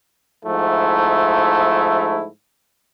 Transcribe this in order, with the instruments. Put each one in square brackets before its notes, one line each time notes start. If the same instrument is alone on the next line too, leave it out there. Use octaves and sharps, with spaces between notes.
[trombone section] G#2 F3 A3 E4